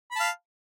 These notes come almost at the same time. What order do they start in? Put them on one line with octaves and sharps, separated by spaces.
B5 A5 F5